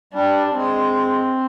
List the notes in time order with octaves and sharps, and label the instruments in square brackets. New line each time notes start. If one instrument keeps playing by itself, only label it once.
[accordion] G3 [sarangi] D4
[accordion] G#3 [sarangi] C4